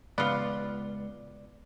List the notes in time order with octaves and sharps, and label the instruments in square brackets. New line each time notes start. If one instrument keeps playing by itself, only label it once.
[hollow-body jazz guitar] C#2 [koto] B3 F4 [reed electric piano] D5